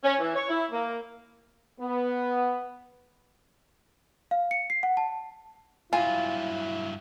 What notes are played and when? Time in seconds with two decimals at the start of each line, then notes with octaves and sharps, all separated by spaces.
0.04 C#4
0.19 E3
0.35 C#5
0.49 E4
0.71 A#3
1.80 B3
4.31 F5
4.51 C#7
4.70 C7
4.83 F#5
4.97 A5
5.93 G2 F#3 E4 F4 G#5